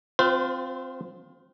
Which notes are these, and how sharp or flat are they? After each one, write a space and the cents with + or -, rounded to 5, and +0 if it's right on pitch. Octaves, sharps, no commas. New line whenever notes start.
C4 +0 F4 +20 C5 -35